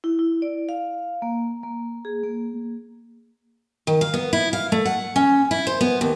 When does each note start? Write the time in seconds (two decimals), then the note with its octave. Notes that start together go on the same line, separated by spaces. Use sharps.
0.04 E4
0.19 E4
0.42 D5
0.69 F5
1.22 A#3
1.63 A#3
2.05 G#4
2.24 A#3
3.87 D#3
4.01 F5
4.14 B3
4.33 E4
4.53 F5
4.72 A3
4.85 F#5
5.16 C#4
5.51 E4
5.67 C5
5.81 B3
6.01 D#2